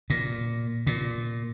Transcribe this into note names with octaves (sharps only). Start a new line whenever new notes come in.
A#2
A#2